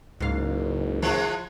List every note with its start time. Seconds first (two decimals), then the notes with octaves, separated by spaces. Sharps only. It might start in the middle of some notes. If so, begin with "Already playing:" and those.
0.20 F#1 C#2 G#2 F5
1.02 E3 F3 G#3